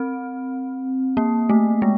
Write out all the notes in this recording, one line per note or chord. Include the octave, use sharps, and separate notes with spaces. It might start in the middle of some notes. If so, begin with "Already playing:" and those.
Already playing: C4
A#3
A3
G#3